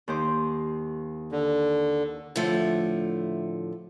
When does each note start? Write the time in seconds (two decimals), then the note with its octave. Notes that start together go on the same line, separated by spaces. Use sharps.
0.08 D#2 G4 C5
1.31 D3
2.36 A2 D3 F3 A3